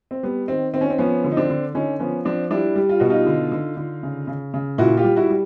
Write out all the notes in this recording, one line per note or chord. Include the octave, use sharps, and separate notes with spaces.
C4
G3 B3
D#3 C4
D#3 C4
C#4
C4
F3 B3 C#4
D3
D#4
C4 D4
D3
D3 C#4 D#4
F3 B3 C#4
F3 C4 D4
G3 D4 E4
G3
F4
B2 F#4
D#4 F4
D3
D3
D3
C#3
C#3
C#3
A#2 E4 F#4
F4 G4
G3
E4 F#4
G3